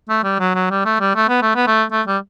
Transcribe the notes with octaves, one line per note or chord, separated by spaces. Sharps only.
A3
G3
F#3
F#3
G3
A3
G3
A3
B3
A3
B3
A3
A3
G3